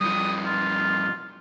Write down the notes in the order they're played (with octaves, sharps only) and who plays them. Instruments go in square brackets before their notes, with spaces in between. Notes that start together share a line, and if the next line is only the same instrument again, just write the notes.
[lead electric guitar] G2 F3 [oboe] D#6
[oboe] F4